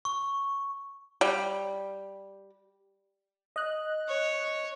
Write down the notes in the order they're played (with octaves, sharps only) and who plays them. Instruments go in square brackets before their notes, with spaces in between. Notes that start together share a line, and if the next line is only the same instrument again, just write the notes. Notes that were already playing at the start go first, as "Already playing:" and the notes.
[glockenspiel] C#6
[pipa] G3
[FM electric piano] D#5 F#6
[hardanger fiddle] C#5